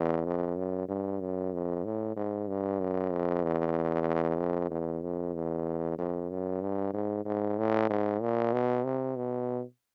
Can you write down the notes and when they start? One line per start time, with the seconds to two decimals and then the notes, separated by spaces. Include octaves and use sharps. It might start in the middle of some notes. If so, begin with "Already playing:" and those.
Already playing: E2
0.25 F2
0.57 F#2
0.89 G2
1.20 F#2
1.53 F2
1.85 A2
2.16 G#2
2.48 G2
2.80 F#2
3.12 F2
3.43 E2
4.39 F2
4.70 E2
5.03 F2
5.34 E2
5.98 F2
6.31 F#2
6.62 G2
6.94 G#2
7.25 G#2
7.58 A2
7.89 G#2
8.21 A#2
8.53 B2
8.84 C3
9.16 B2